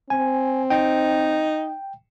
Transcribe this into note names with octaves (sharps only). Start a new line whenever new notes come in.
C4 G#5
D#4 G5